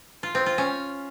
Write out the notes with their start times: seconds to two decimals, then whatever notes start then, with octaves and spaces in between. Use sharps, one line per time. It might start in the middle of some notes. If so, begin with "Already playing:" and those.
0.23 F4
0.35 C4
0.46 F4
0.58 C#4